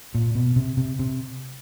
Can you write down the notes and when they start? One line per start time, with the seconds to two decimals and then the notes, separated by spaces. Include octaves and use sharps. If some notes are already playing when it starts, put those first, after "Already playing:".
0.15 A#2
0.35 B2
0.56 C3
0.77 C3
0.99 C3